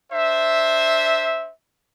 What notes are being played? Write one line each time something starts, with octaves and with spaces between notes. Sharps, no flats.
D4 C5 E5